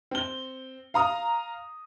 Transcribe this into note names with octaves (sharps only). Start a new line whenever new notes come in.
C4 G7
F5 A#5 D#6